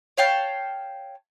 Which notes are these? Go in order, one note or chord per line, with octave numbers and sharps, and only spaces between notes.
C#5 F5 G5 A5